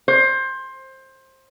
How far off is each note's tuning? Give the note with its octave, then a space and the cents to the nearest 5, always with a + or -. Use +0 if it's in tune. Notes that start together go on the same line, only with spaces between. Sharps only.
C5 +20